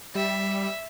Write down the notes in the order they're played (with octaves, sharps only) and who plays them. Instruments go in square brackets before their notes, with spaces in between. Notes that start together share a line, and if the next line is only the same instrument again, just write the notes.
[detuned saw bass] G3 [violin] E5